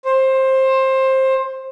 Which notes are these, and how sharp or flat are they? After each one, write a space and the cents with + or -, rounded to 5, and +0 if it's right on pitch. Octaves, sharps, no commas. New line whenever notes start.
C5 +20